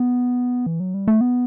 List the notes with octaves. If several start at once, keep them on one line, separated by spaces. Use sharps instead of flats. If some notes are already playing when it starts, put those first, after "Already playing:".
Already playing: B3
E3
F#3
G3
A3
B3